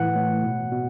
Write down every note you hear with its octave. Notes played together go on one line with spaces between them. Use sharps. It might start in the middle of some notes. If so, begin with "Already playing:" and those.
Already playing: A2 E3 F#5
A2
B2
B2